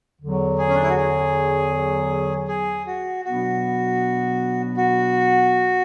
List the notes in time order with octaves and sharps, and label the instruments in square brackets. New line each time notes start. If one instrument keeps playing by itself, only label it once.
[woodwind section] E2 D3 F#3
[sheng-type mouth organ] G#4
C#4
D4
E4
F#4
G#4
G#4
F#4
[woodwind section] B2 F#3 B3 D4 [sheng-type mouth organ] F#4
[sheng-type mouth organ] F#4